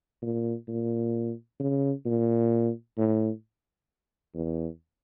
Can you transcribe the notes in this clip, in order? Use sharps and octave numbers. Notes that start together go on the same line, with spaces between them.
A#2
A#2
C#3
A#2
A2
E2